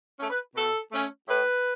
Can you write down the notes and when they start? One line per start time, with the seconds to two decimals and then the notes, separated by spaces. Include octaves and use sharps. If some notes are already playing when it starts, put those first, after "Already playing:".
0.18 A3 C#4
0.30 B4
0.55 B2 A4
0.92 A3 C#4
1.28 A2 B4